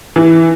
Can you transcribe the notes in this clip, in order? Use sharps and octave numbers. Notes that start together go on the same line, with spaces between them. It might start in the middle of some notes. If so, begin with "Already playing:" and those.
E3